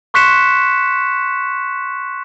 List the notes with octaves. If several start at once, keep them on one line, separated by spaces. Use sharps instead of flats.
C6 C#6 F#6 B6 C#7 E7